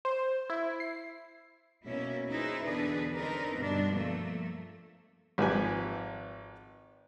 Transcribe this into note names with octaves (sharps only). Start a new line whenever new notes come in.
C5
E4
C7
B2 A#3 C#4 E4
D#4 E4 G#4 B4 C5
E2 B2 D3 D4 G#4 B4
C4 D4 D#4 A#4 B4
G2 B2 D3 G3 D4
F3 A3 A#3
G#1 F3 G4 B4 G#5